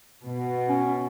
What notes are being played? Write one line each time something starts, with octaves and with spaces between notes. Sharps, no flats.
B2
C#4